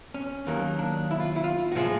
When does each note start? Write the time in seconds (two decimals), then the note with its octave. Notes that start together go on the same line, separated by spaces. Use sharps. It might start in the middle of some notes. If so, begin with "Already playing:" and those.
0.14 C#4
0.47 D#2 D#3 F#3 A#3
0.78 D4
1.11 E4
1.20 F4
1.36 E4
1.44 F4
1.72 F#4
1.75 A2 F3 G#3 F4